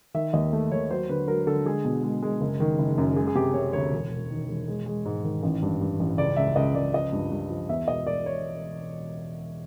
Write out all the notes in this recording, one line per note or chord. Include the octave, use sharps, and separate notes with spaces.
D#3 E5
D#2 D#5
A3
D#2 C#5
F#3 C5
D3 B4
F#3 A#4
D3 A4
G#3 G#4
B2
G#3
G#3
F#1
D#3
F#1
F#2
G#3 G#4
G#4
C3 G4
C3 C#5
D2 C#5
E1
E1
D#3
E1
G#3
G#3
G#2
D#3
A1
G2
G2
A1
C#2 D5
C#2 E5
C#2 D#5
C#2 D5
F3 D#5
G2
G2
F3
E2 E5
B2 D#5
E1 D5
C#5